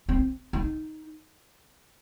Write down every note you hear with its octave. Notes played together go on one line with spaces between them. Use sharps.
C4
D#4